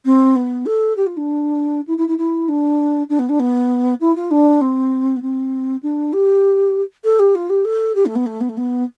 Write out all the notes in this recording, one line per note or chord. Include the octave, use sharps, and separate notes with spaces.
C4
B3
A4
G4
F4
D4
E4
E4
E4
E4
D4
D4
B3
D4
B3
E4
F4
D4
C4
B3
C4
D4
G4
A4
G4
F4
G4
A4
G4
A3
B3
A3
B3
A3
B3